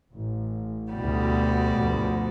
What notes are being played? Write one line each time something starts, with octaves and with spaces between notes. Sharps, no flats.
A1
D2 B2 G3 F#4
D2 G2 F3